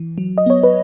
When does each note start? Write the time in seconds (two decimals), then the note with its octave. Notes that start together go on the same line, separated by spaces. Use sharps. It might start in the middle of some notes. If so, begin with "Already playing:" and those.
Already playing: E3
0.18 F#3
0.38 D#5
0.46 B3 C#5
0.63 B4